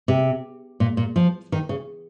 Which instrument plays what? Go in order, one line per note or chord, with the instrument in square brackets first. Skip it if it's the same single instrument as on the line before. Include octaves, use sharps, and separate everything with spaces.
[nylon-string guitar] C3
A#2
A#2
F3
D#3
C#3